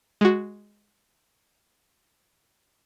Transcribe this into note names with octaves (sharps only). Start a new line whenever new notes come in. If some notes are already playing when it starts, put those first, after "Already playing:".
G#3 F#4